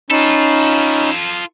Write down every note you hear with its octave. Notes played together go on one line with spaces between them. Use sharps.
C#4 D#4 F4 A4 B5